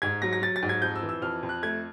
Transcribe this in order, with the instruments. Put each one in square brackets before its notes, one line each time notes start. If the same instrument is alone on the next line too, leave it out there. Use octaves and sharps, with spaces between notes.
[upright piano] G#2 G#6
F#3 A#6
A#6
F#3 A6
A6
G#2
G#6
F2 G6
E6
E3
E6
F2 F6
F2
F#6
A3 G#6